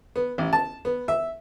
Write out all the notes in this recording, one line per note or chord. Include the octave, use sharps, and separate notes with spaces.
B3
A1
A5
B3
E5